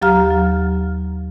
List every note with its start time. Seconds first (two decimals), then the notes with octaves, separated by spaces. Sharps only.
0.02 D#2 F#3 G4 F5 A#5 F6
0.31 F#3